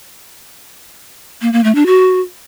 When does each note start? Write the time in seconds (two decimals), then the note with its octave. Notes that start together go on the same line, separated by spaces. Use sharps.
1.42 A#3
1.53 A#3
1.64 A3
1.75 D4
1.86 F#4